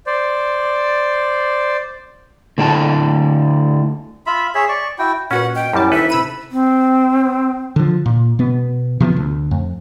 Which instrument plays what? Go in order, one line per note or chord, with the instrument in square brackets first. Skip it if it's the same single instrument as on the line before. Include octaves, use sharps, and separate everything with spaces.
[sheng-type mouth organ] C5 D5
[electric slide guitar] D3 A3 E4 G5 A5
[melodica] F4 E5 B5
G#4 C#5 E5
D5 C#6
E4 F#4 G5
[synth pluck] A#2 F#4 B4 [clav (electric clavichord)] C#4 [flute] F#5
[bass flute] D#5 [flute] G5
[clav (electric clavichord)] F#2 G3 [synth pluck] C#4 A5 [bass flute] E4
[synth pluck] D#2 [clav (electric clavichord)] A4 B4 [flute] E5
[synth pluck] C3 E6 D#7 [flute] B5
[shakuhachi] C4
[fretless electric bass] D3 F3
A#2
B2 B3
C3 F3 A3 B3
D2
F2